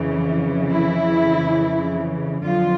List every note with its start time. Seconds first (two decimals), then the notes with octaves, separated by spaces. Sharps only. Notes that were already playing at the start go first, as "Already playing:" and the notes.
Already playing: F2 C#3 E3
0.72 E4
2.44 F2 D3 F#3 F4